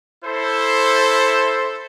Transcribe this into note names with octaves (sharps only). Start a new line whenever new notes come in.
E4 A4 C5